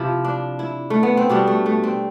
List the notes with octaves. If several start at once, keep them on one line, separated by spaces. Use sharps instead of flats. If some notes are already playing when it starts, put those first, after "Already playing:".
Already playing: C3 F3 E4
D4
E4
A3
B3
C4
B2 G3 D4
A3
A3
C4